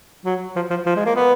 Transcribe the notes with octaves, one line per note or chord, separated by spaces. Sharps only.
F#3
F3
F3
F3
G#3
A#3
B3